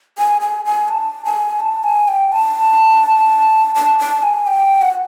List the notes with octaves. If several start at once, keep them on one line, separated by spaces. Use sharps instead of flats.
G#5
G#5
G#5
A5
G#5
A5
G#5
G5
A5
A5
A5
G#5
G5
F#5